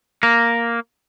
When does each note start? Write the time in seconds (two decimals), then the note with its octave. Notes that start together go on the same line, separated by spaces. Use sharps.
0.23 A#3